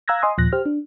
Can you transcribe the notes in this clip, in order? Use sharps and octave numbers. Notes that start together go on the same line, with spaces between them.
F5 A#5 E6 F#6 G#6 A#6
D#5 G#5 C6 D#6
D#2 A#2 F3 F#6 A#6
G4 C5 F6
D4